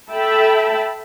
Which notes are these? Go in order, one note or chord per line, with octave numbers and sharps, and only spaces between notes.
A4 E5 G5 A5 B5